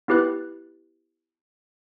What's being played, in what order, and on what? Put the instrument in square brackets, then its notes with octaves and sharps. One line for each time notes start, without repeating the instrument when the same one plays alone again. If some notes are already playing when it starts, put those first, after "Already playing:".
[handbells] B3 E4 G4 B4 F#6 A6